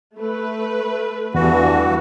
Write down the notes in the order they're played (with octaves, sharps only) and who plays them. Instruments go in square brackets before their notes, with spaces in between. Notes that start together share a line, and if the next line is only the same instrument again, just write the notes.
[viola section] A3 B4
[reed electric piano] E2 [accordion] G2 E3 F#4